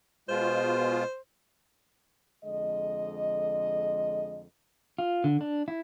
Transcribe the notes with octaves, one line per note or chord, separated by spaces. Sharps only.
B2 G#3 F4 C5
F2 D3 G#3 D#5
F4
D3
D4
E4